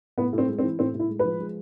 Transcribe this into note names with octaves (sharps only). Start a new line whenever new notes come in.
A2 B3
A2
C4
G#3
C4
E3
A2 C4
A2
E4
G#3
B4
F3
G#3